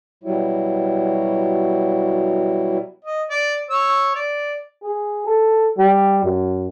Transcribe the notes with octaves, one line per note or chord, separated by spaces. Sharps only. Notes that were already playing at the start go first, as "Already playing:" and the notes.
B2 F#3 G3 E4
D#5
D5
C#5 E6
D5
G#4
A4
G3
F#2